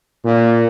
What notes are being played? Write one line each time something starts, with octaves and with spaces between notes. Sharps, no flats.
A#2